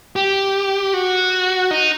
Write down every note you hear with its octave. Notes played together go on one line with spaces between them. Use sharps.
G4
F#4
D#4